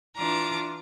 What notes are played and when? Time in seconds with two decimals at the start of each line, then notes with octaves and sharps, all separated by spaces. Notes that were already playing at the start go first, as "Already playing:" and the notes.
0.17 E3 D4 F4 A#5 D6